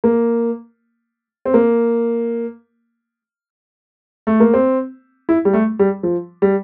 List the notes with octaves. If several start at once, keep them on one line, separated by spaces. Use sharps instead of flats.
A#3
C4
A#3
A3
A#3
C4
E4
G3
A3
G3
F3
G3